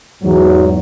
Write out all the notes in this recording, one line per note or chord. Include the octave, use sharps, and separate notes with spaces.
E2 G#2 F#3